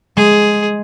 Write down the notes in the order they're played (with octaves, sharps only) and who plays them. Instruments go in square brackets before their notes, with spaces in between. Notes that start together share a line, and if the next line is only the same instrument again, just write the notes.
[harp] G#3 [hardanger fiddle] G#4